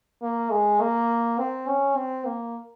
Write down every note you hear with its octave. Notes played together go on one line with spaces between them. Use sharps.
A#3
G#3
A#3
C4
C#4
C4
A#3